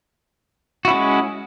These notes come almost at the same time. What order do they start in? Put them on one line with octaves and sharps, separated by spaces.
F#4 E4 C#4 G#3